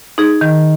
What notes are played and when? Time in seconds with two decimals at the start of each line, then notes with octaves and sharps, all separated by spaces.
0.18 D#4 G#4
0.41 D#3